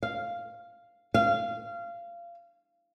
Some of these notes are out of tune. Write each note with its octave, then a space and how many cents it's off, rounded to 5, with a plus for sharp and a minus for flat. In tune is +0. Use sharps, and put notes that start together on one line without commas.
F5 -5
F5 -20